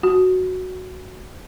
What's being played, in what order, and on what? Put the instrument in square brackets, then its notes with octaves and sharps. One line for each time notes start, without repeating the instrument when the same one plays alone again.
[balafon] F#4